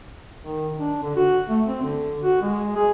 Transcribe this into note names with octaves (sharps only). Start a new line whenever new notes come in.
D#3
D4
D3
F#4
A3
C4
D3
F#4
G#3
G#4